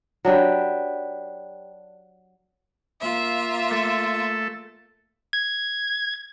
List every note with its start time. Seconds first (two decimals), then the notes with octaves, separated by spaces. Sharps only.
0.25 F#3 D4 G4 B4
3.01 A#3 F4 E5
3.71 A3 A4
5.33 G#6